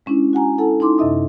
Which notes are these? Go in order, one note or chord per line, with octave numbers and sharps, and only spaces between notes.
G#3 C#4 D4 E4
F#4 F#5 G#5 A#5
E4 A4 F#5 A5
D#4 E4 C6 D6
F#2 C3 D#5 E5 D#6